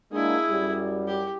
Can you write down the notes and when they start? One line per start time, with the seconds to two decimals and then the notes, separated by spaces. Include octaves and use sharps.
0.12 G#3 A#3 D4 E4 G#4
0.50 F#2 G3
1.07 G4